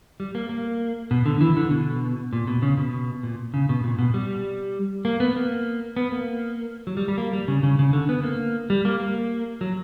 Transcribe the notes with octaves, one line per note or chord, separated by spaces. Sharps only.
G3
A#3
A#3
B2
D3
E3
D3
B2
A#2
B2
C#3
B2
A#2
C#3
B2
A#2
B2
G3
A#3
B3
A#3
B3
A#3
F#3
G3
G3
A#3
G3
C#3
C#3
C#3
D3
B3
A#3
G3
A#3
A#3
F#3